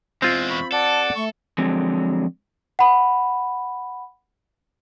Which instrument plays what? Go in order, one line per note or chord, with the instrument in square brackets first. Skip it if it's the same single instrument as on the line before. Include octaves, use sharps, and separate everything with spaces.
[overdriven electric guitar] E2 G#3 [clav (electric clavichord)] C4 F4
[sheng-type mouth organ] B5 [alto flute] C#6
[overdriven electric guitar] A4 [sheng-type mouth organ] D5 F#5 [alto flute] A5
[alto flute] A3 [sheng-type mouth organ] C#6
[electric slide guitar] D3 F3 F#3 G#3 C4
[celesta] F#5 B5